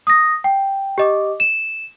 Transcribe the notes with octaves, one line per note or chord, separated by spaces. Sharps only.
D#6 A#6
G5
G4 D#5 D6
E7